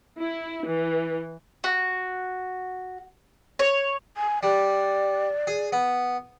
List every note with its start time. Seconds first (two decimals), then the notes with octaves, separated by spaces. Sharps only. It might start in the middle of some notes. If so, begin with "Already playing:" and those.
0.20 E4
0.67 E3
1.64 F#4
3.59 C#5
4.17 G#5
4.43 G3 D5
5.47 G#4
5.73 B3